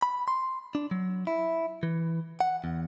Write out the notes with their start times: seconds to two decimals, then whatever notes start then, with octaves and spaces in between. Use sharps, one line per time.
0.02 B5
0.28 C6
0.75 D4
0.91 F#3
1.27 E4
1.83 E3
2.40 F#5
2.64 E2